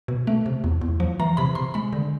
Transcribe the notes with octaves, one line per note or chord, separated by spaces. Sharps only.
B2
A3
C3
E2
E2
F3
E3 A#5
C3 B5
C3 C6
G#3 B5
D3